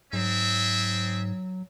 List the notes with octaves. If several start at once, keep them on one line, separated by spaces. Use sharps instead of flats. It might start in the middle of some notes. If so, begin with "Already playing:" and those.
G#2 F#3 C4 G#4 E5